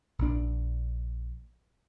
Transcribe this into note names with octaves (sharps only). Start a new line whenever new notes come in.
A#1 D4